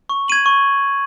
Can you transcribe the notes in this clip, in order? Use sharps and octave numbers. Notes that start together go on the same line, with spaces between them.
C#6
G#6 D#7 F#7
C#6